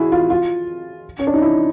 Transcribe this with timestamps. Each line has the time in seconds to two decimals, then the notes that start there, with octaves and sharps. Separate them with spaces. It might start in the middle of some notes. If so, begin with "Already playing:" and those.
Already playing: E4 F#4 G#4
0.12 F4
0.30 F4
1.19 C#4
1.27 D4
1.34 D#4
1.42 E4